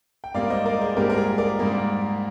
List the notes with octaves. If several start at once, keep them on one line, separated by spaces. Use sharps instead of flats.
G5
G#2 G3 A#3 D5 F5
C5 D#5
A#4 D5
G#4 C5
G#2 G3 A#3 G4 A#4
A#4
G#4
A#4 D5
G#2 G3 A#3